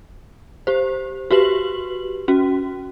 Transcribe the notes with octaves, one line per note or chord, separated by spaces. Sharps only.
G4 C5
F#4 G4 B4 F#7
C#4 F#4